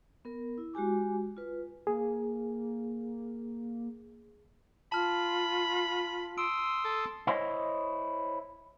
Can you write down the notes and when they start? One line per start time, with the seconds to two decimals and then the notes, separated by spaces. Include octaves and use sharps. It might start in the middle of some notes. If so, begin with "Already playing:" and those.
0.25 B3 A#4
0.58 E4
0.74 G#3 F#4 G4 G#5 D6
1.37 F4 B4
1.87 A#3 G#4
4.92 F4 A5 B5 F6
6.38 C6 D#6 E6 D7
6.85 A4
7.27 E4 C5 C#5 D#5